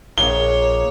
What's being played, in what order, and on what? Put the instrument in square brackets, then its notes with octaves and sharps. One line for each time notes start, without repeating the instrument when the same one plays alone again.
[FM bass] A#1 [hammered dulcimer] A#3 G#4 [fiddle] C#5 [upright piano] G7